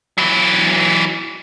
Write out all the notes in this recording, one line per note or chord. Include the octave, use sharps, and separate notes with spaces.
E3 F#3